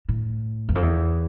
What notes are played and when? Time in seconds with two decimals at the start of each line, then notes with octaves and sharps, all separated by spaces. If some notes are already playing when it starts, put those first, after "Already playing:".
0.09 A2
0.69 E2
0.75 F2
0.83 E2